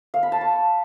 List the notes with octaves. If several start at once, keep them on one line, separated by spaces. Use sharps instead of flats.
F5
B5
A5
C#6